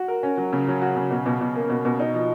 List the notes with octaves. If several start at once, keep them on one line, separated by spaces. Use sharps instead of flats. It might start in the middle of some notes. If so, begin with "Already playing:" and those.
Already playing: F#4
A#4
C#4
F#3
C#3
F#3
F#4
C#3
B2
B2
B2
A#3
B2
B2
D#4
F3